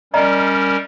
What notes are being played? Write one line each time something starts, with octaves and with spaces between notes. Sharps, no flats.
G3 C#4 A#4 D5 D#5 A#5